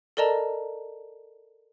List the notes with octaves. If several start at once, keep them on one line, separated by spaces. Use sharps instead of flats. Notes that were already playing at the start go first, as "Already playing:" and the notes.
A4 A#4 D5 D#5 A5 A#5